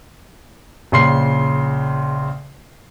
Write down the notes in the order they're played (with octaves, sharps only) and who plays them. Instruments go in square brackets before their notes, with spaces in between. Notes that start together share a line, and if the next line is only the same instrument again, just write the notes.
[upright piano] A#1 C#3 C6 C7